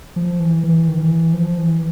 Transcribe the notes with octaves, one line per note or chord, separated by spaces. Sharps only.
F3
E3
E3
D#3
E3
F3
E3